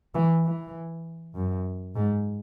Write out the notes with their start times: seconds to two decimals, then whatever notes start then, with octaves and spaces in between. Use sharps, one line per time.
0.15 E3
0.45 E3
1.35 F#2
1.95 G#2